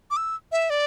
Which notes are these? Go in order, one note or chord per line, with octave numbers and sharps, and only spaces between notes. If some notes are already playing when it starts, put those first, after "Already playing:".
D6
E6
E5
D5